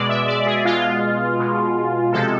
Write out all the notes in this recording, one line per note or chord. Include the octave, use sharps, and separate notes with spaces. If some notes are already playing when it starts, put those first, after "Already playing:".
Already playing: B2 G#3 D5
E5
D5
G#4
B2 G#3 F4
B2 G#3
C3 F3 G#3 A4